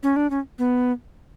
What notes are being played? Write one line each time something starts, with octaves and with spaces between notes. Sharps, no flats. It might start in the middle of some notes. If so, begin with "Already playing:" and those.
C#4
D4
C#4
B3